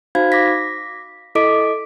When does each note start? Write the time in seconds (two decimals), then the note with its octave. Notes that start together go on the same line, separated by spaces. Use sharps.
0.15 D#4 F#4 C5 F5 B5 G#6
0.32 D6 A#6 B6
1.35 E4 A4 D#5 D6 B6 D7